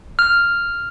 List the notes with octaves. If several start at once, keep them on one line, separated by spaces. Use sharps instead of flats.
F6